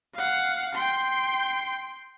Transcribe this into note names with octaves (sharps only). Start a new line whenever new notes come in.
F5 F#5
G5 C6